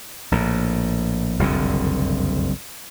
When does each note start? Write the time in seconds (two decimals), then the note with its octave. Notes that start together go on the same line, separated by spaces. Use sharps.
0.32 A#1 A2
1.39 F#1 C2 F2 D3